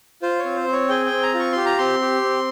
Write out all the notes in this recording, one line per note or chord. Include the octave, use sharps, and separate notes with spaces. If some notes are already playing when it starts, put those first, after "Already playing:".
F4 C5
C#5
C4
C5
C4
C#5
G#4 G5
G5
C4
A#5
F4
C#6
G4 C6
A#5
C4 C6
G4
C4